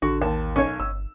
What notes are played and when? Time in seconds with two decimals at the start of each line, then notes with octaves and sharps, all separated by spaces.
0.02 A1 D3 F#4
0.22 D#2 A5
0.56 B1 C#4 C#5
0.80 G1 E6